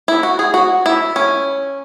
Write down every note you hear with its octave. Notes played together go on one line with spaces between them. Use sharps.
E4
F#4
G#4
F#4
E4
C#4